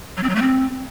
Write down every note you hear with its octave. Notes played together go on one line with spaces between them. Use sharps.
F#3
C4
F#3
A3
C4